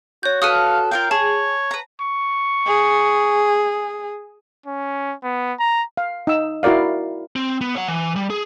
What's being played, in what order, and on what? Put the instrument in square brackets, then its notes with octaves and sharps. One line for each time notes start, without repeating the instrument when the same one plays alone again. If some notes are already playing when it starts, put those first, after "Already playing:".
[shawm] F#4 [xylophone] C#5 G6
[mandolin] F#4 A4 B4 [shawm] F5 [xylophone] D#6 F6 D#7
[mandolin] F4 A#4 F5 [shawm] G5
[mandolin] G#4 [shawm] C#5 [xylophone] A5
[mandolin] B4 A#5
[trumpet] C#6
[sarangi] G#4
[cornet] C#4
B3
A#5
[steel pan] F5
D#4 E6
E4 F#4 A#4 D5 F5
[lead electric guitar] C4
B3
C#5 F#5
E3
G3
G#4